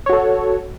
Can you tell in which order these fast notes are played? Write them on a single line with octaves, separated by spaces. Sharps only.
C#5 F#4 A4